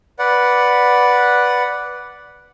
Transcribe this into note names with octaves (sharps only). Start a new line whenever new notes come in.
B4 D5 F#5